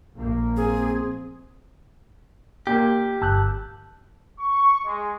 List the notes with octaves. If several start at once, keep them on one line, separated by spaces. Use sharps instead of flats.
A#1 A#3
C4 G#4
A#2 A#3 G4
G1 A5 E6 F#6 G6
C#6
G#3